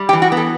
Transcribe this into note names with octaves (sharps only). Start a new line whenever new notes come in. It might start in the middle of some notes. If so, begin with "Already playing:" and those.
Already playing: G3
G4
E3
F#4
B3
A4